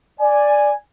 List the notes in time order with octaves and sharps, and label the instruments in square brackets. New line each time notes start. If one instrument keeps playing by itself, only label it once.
[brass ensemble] D5 G#5